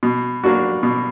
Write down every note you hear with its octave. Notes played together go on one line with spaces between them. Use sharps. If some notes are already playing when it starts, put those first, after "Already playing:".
B2
F#3 A#3 D4 F#4
B2